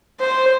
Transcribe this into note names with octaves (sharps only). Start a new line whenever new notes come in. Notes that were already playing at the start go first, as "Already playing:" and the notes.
C5